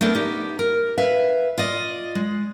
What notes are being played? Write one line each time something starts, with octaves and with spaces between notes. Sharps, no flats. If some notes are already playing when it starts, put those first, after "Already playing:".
A3 B3 C4 D4 A4 A#4
B3 D#4 G4
A#4
B4 E5 F5
F4 D5 D#5
G#3